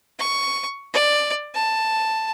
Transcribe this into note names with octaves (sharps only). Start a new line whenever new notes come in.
C#6
D5
A5